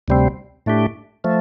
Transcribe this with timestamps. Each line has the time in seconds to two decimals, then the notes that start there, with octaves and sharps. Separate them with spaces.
0.08 D2 C3 G3 C4
0.66 A2 A3 D4 G4
1.24 F3 A3